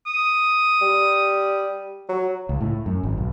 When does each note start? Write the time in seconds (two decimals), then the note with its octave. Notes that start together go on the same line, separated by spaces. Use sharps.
0.07 D#6
0.81 G3
2.09 F#3
2.49 C#2
2.61 A2
2.86 F#2
3.03 G#1
3.18 B1